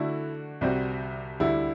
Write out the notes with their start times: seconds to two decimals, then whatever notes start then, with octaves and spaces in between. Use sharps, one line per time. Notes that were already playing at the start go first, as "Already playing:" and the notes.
Already playing: D3 A3 D4 E4 F#4
0.61 C2 C3 G3 C4 F#4
1.40 D2 D3 G3 E4